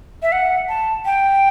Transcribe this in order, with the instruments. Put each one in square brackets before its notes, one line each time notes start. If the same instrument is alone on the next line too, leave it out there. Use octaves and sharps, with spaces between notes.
[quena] E5
F#5
A5
G5